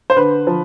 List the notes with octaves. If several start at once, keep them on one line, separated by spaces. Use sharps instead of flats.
C5
D3 B4
F3